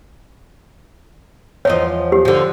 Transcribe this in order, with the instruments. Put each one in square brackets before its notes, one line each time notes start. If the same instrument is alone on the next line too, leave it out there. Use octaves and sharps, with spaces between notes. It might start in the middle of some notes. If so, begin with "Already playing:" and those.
[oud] E2 F3 D#5 [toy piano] C#5
[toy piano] G4
[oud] D3 F3